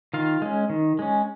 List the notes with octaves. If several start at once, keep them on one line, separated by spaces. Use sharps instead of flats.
D#3 F4 F5
G#3 C#4
D#3
G#3 C#4